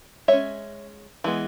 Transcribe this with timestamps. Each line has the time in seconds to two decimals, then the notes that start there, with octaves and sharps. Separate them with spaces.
0.28 G#3 C#4 C#5 E5
1.24 E3 G#3 B3